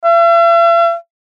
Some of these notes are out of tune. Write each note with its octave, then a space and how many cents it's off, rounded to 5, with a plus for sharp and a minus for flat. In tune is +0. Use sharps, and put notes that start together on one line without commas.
E5 +45